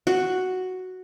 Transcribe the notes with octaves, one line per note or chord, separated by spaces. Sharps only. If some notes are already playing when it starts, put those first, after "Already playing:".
F#4